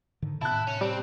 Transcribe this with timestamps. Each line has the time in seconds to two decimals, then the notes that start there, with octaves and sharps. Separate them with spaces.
0.22 G#2 D3 D#3
0.41 A2 C3 E4 A5 F#6
0.67 C#4
0.81 G3 C4